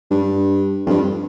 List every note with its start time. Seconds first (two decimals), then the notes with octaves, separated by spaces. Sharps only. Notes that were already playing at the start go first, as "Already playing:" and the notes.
0.11 G2
0.86 F2
0.90 G2